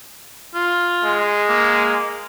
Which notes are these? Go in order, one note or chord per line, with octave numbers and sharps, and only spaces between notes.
F4
G#3
A#3